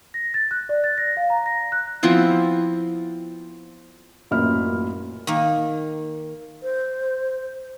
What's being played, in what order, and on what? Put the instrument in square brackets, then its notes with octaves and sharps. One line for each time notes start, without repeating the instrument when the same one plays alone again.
[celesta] A#6
A6
F#6
D5
A6
A#6
F5
A#5
A#6
F#6
[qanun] F3 B3 C4 E4
[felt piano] A1 F#2 A#2 E5 B5 F6
[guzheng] D#3 A#3
[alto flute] C5